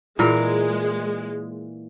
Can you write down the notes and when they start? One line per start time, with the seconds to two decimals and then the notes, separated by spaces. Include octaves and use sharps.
0.19 A#2 E3 G#3 A#4